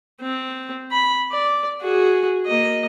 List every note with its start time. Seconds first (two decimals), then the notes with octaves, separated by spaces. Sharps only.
0.21 C4
0.92 B5
1.32 D5
1.81 F#4 G#4
2.46 A#3 D#5